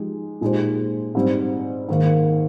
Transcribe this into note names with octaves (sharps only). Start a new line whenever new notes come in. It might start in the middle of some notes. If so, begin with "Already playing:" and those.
Already playing: F3 G#3 D#4 G4
A#2 G#3 D#4 G4 C5
G#2 G3 C4
G#2 D#3 A#3